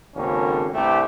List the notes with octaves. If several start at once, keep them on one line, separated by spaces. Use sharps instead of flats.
G#1 D#2 C#3 A#3 C#4 A4
C2 G2 A3 G4